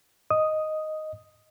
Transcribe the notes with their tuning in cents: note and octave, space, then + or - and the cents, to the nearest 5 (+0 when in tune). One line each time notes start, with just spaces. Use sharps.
D#5 +0 D#6 +0